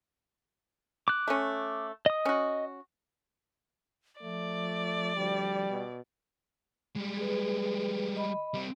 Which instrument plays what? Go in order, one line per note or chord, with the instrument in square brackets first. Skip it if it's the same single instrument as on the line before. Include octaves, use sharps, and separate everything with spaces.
[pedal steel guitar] D6 F#6
[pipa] A3 C#4
[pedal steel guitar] D#5 D#6
[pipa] C#4 F#4
[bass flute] F3 [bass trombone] A3 [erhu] D5
[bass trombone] D2 [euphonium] G3
[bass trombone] B2
[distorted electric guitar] G3 G#3
[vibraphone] G#4 B4
D#5 B5
[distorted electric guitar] G3 C4